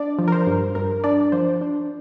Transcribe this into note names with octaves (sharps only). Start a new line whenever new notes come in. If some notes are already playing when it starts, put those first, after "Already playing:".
Already playing: D4 D5
F3
A#4
C5
G2
G2 A#4
D4 D5
F3 C5
D4